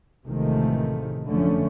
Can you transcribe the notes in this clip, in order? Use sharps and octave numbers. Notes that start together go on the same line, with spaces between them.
A1 C3 D#3 F3 G#3 A3
F#1 F2 D3 F3 A3 C#4